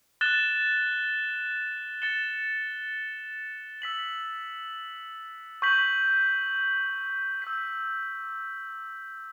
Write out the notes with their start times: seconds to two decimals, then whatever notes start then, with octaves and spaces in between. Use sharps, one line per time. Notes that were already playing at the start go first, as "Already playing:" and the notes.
0.21 F#6 A6 E7 G7
2.02 A6 C#7 E7 G7
3.82 E6 B6 F#7
5.62 C#6 G6 B6 F#7
7.42 E6 G6 B6